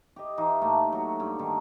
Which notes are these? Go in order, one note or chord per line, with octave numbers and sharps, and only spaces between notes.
G4 D#5
E3 D#4 F4
A2 A3 A#3
F#3 F#4
G2
D3 D#3